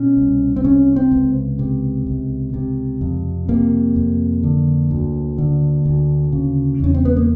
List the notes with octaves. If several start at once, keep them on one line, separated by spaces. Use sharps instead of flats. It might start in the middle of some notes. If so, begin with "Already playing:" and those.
Already playing: B2 C#4
C2
C4
C3 C#4
C4
C#2
C3
C#2
C3
F2
C3 A#3
F2
D3
D2
D3
D2
C#3
E2 C#4
C4
B3
A#3